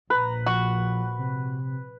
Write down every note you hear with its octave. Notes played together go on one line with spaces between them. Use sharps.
A#1 B4 A#5
F3 F#4
C3